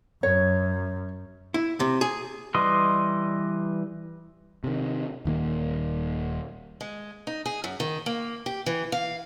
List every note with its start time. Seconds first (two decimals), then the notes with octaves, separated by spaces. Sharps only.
0.23 F#2 C#5
1.54 E4
1.80 C3
2.01 G#4
2.55 E3 G3 D#5 C6
4.64 C3 D#3
5.25 D#1 D#3 A#3
6.81 G#3
7.27 D#4
7.46 G#4
7.64 F#2
7.80 D#3
8.06 A#3
8.46 G4
8.66 E3
8.92 F5